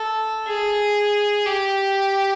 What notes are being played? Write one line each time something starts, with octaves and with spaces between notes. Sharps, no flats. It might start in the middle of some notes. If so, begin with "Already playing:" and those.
Already playing: A4
G#4
G4